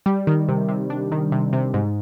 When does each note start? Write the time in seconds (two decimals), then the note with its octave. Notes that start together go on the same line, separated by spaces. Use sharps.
0.06 G3
0.27 D#3
0.49 C3
0.69 C3
0.90 D4
1.12 D#3
1.32 C3
1.53 C3
1.74 G#2